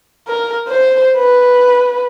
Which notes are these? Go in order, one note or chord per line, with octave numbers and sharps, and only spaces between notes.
A#4
C5
B4